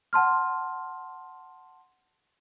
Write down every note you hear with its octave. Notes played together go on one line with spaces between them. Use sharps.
F#5 A5 C6 F6